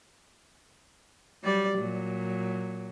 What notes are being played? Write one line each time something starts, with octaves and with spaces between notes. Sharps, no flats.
F#3 G3 D5
A#2 F#3